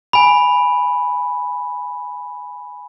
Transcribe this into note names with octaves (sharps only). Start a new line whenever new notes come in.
G#5 B5